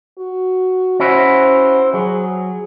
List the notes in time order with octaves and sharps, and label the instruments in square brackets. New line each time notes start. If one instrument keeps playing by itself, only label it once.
[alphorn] F#4
[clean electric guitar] C#4 E4 F#4 [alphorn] C5
[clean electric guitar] F#3 [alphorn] G#4